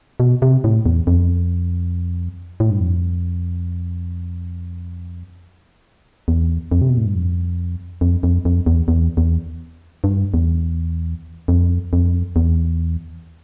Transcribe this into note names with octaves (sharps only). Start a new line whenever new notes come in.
B2
C3
A2
E2
F2
A2
G2
F2
E2
F2
C3
B2
A2
G2
F2
F2
F2
F2
E2
E2
E2
G2
E2
F2
F2
E2